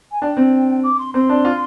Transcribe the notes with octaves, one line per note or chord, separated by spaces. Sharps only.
G#5
D4 G5
C4
D6
C6
C4 C6
D4
F4